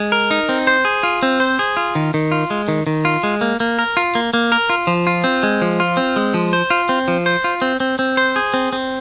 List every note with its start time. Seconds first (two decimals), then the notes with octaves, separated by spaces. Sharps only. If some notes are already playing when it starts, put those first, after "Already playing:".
Already playing: G#3
0.12 A#4
0.31 D#4
0.49 C4
0.67 C5
0.85 G#4
1.03 F4
1.23 C4
1.40 C5
1.59 G#4
1.77 F4
1.95 D#3
2.14 D#3
2.32 F4
2.50 G#3
2.68 D#3
2.87 D#3
3.05 F4
3.23 G#3
3.41 A#3
3.60 A#3
3.79 A#4
3.97 F4
4.15 A#3
4.33 A#3
4.52 A#4
4.70 F4
4.87 F3
5.07 F4
5.24 C4
5.43 G#3
5.62 F3
5.80 F4
5.97 C4
6.16 G#3
6.34 F3
6.53 C5
6.70 F4
6.89 C4
7.08 F3
7.26 C5
7.44 F4
7.62 C4
7.80 C4
7.99 C4
8.17 C5
8.36 G#4
8.54 C4
8.73 C4